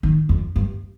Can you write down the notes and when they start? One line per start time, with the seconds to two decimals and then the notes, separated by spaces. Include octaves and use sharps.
0.03 D#3
0.29 F2
0.56 G2